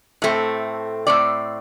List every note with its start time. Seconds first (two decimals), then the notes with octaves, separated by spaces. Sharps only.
0.22 A2 A3 C4
1.07 A2 A3 C4 D5